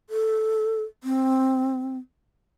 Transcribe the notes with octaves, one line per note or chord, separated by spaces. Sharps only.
A4
C4